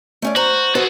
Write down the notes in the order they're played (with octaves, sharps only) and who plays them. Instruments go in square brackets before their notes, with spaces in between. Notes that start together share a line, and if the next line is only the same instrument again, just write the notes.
[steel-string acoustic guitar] A3 C#4 D5
[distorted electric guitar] F#4 [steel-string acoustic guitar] C5 A#5
[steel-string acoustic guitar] F#4 B4 C5 [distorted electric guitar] G#4 A4